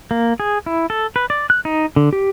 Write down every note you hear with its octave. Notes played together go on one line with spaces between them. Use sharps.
A#3
G#4
E4
A4
B4
D5
F#6
D#4
D3
G4